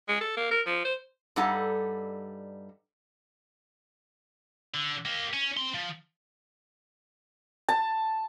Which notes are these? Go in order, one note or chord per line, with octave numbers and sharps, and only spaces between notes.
G#3
A4
A#3
A#4
F3
C5
G2 G3 D#4 A4 F#5 A#5
D3
A#3 G4
C#4
C4 C6
F3
A5